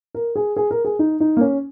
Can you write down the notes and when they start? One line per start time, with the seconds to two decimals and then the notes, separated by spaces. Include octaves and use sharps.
0.15 A#4
0.36 G#4
0.57 G#4
0.71 A#4
0.85 G#4
0.99 D#4
1.20 D#4
1.37 A#3
1.41 C#4